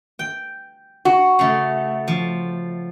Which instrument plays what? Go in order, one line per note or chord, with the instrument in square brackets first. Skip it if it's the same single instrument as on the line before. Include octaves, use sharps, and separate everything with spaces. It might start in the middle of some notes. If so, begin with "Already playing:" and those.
[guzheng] G5
[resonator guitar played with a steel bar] F#4
[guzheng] C#3 A3
F3